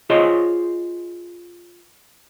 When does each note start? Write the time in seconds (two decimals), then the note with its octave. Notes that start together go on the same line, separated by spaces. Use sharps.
0.10 F4 G#4 C5 C#5 D#5